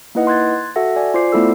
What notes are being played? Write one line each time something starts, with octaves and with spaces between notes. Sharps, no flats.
A#3 D#4 E4 B4 D#5 F#5
C6 F#6 G#6 A6
F#4 A4 E5 F#5 A#6
D5 G#5
F4 C5 D5 D6 C7
A3 B3 E4 F4 A4 E6